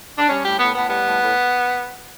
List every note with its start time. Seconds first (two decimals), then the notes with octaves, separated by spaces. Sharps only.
0.18 D4
0.29 G3 C#4
0.44 A2 G4
0.59 A2 B3
0.75 A2 B3
0.89 G3 B3
1.05 A2
1.20 A2